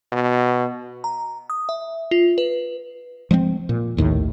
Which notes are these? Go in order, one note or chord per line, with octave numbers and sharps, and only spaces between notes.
B2
A#5
D#6
E5
F4
B4
F3 G#3 A3 C4
A#2
A#1 D#2 A2 D#3